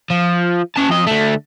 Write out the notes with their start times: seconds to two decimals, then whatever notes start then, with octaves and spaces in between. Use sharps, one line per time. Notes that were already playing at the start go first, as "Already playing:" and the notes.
0.10 F3
0.76 C#4 A5
0.89 F2 D#5
1.07 D3 A3